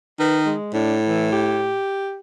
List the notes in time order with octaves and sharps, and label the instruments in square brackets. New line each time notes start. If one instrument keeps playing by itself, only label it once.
[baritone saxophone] D#3 [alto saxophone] B4
[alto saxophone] G#3
[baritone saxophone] A2 [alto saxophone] D4
[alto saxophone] E3
G4